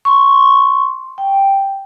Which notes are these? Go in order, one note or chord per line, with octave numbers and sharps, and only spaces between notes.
C6 C#6
G5